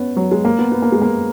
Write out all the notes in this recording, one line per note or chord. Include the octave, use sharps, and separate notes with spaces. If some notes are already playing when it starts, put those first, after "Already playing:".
Already playing: B3 C#4
F#3
G#3
A#3
B3
B3
A#3
G#3
A#3